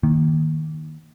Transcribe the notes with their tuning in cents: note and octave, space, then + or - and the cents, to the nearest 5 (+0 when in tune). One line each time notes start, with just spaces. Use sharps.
D#3 +0 A#3 +0